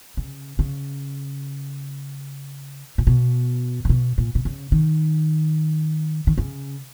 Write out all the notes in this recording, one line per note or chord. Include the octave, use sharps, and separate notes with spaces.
C#3
C#3
A#2
B2
C#3
B2
A#2
B2
C#3
D#3
D#3
C#3